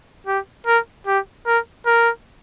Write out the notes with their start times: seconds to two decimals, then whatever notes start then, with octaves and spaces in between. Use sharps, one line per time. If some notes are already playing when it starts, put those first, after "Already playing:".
0.27 G4
0.66 A#4
1.07 G4
1.46 A#4
1.86 A#4